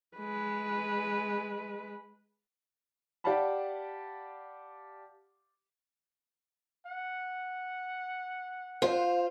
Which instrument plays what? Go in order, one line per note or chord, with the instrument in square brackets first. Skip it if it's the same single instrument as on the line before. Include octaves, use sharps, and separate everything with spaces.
[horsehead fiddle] G#3 B4
[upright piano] G4 D5 F5 F#5 A5 B5
[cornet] F#5
[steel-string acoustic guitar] F4 [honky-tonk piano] C5 [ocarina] F5